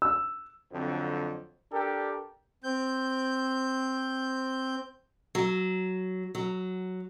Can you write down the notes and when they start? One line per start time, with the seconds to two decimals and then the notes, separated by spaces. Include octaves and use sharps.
0.02 E6
0.72 F2 D3 F#3 C4
1.71 D4 G4 A4 A#4
2.64 C4 G6
5.35 F#3
6.35 F#3